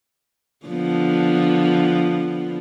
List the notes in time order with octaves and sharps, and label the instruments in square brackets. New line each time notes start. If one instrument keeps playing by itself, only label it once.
[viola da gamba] D3 F3 B3